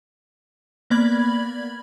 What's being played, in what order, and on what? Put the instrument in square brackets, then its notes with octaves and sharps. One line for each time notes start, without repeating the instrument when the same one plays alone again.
[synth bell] A#3 B3 D5 B5 G#6 F#7